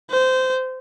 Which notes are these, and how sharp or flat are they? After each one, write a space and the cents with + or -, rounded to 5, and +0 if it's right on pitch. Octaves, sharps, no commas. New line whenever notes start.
C5 -20